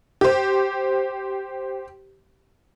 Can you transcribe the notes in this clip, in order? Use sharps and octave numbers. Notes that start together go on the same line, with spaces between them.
G4 C5